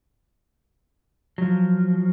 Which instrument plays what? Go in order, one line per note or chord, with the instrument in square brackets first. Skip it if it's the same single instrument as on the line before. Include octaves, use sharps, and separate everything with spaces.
[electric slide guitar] F3 F#3